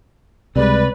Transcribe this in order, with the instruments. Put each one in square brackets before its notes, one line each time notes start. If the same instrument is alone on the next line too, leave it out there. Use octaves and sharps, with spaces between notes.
[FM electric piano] C#2 G3 G#3 [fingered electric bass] C3 [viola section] B4 [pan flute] D5